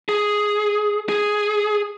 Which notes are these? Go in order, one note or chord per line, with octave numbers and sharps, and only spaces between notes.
G#4
G#4